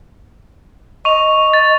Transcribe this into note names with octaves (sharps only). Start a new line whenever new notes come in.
D#5 C#6 F7
A6